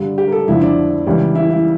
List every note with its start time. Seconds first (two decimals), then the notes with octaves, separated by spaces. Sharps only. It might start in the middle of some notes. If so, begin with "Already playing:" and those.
Already playing: G2 D3 G3
0.18 G4
0.28 A#4
0.32 A4
0.48 F2 D3 F3 E4
0.61 D4
1.06 C#2 C#3 E3 G3
1.35 E4
1.50 E4